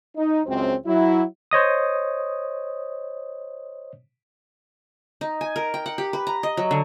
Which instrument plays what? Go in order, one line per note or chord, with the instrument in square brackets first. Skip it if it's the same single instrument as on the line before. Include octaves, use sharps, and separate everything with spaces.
[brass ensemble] D#4
C#2 F#2 C4
F#3 E4
[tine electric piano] C5 C#5 D#5 D#6
[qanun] D#4
G#5
A#4
G5
F#5
G4
B4
A#5
D#5
F#3
D3